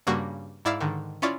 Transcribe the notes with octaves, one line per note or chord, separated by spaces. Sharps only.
G2 C#3 G3 A#3 F#4
G#2 E4 D5 E5 F5
G#2 D3 D#3
C#4 E4 F4 C#5 D5